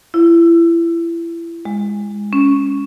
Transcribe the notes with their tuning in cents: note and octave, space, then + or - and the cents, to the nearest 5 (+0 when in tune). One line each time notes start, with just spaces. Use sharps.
E4 +30
G#3 -15
C#4 +10